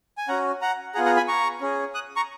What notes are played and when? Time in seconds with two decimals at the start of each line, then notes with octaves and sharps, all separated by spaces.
0.18 G#5
0.28 C#4 F#4 F#5 A#5
0.61 F#5 A#5
0.95 G#4 F#5 A#5
0.98 B3 F4
1.05 F#5 A#5
1.16 G#5 B5
1.28 A#5 C#6
1.61 C#4 G#4
1.94 D#6 F#6
2.16 A#5 C#6